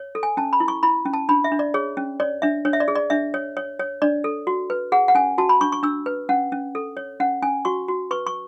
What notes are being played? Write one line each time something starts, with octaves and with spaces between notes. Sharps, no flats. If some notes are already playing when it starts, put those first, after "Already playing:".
Already playing: C#5
A4
G#5
C#4 A5
B5
E4
C#6
E4 B5
C#4
A5
D4 B5
E5
D4
D5
G#4 C#5
C#4
C#5 D5
D4 E5
D4 C#5
E5
D5
G#4
D5
D4 E5
C#5
C#5
C#5
D4 D5
A4
F#4
B4
G#4 F#5
F#5
C#4 G#5
F#4 A5
B5
D4 C#6
C#6
D4 E6
B4
C#4 F#5
C#4
A4
C#5
C#4 F#5
C#4 G#5
F#4 C#6
F#4
B4 C#6
C#6